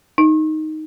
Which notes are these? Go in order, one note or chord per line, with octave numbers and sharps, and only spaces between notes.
D#4